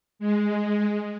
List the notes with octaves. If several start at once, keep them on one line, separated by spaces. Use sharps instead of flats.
G#3